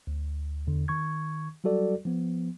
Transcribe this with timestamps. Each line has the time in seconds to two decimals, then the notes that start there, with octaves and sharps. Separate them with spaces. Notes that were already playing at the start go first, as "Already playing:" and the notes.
0.07 D2
0.67 E2 D3
0.88 D#3 C#6 G#6
1.64 F#3 G3 F#4 A4 D5
2.05 F3 B3